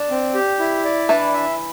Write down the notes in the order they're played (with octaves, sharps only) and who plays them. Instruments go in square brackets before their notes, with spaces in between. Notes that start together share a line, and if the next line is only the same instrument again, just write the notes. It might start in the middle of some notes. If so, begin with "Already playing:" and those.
Already playing: [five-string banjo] D4
[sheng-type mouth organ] C4
G4
E4
D5
[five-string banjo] E3 E4 [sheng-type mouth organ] D4
[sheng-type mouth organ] E5